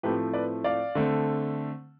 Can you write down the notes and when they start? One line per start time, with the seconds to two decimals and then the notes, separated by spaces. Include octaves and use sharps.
0.03 A2 F3 A3 C4 G4 B4
0.33 B4 D5
0.64 D5 F5
0.95 D3 A3 C4